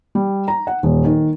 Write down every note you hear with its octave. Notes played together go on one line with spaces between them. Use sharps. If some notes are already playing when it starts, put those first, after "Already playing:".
G3
A#5
F#5
D#1
D#3